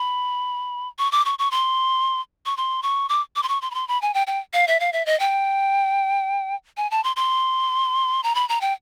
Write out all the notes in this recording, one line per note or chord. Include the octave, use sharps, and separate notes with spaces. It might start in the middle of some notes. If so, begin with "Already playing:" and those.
Already playing: B5
C#6
D6
C#6
C#6
C6
C#6
C6
C#6
D6
D6
C6
C#6
C6
B5
C6
B5
G#5
G5
G5
F5
E5
F5
E5
D#5
G5
G#5
A5
C6
C6
A#5
B5
A#5
G5